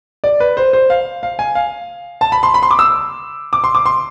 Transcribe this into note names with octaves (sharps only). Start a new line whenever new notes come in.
D5
B4
C5
C5
F5
F5
G#5
F5
A5
B5
C6
B5
C6
D6
E6
D6
C6
D6
C6